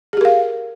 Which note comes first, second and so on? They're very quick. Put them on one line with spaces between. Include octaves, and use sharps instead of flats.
G#4 G4 A#4 F5